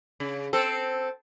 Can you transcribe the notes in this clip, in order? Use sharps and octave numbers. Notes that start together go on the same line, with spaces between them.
C#3
C4 A4